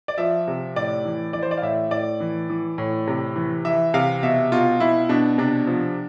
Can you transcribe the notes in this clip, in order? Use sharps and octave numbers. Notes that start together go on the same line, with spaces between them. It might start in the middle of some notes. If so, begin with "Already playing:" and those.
D5
F3 E5
C3
A2 D5
E3
E3 D5
C5
D5
F5
A2 E5
A2 D5
E3
E3
A2
C3
E3
E3 E5
C3 F5
B2 E5
B2 F4
B2 E4
B2 D4
C3 D4
F3